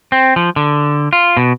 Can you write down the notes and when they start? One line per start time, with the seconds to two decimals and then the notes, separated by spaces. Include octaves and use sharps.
0.12 C4
0.36 F3
0.56 D3
1.13 F4
1.37 B2